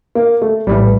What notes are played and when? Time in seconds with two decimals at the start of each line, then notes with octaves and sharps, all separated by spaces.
0.15 A#3
0.42 A3
0.67 A#1 A2 E3 G3